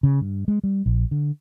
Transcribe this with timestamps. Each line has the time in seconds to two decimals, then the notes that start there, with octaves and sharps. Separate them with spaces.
0.03 C#3
0.21 G2
0.48 G#3
0.64 G3
0.86 A#1
1.11 D3